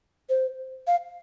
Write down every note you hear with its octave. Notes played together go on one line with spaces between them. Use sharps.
C5
F5